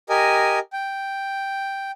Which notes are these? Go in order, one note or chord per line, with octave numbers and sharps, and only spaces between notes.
G4 A#4 D#5 G#5
G5